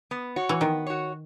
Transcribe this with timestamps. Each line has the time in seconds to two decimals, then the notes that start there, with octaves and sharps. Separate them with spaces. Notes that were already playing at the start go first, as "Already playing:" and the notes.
0.11 B3
0.36 F#4 C#5
0.49 E3
0.60 D#3 B3
0.86 F#4 C#5